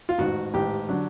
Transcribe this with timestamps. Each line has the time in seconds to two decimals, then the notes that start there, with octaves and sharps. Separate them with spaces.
0.09 F4
0.18 A1 G#2 D#3 F#4
0.54 A1 G#2 D#3 G4
0.89 D3 F#3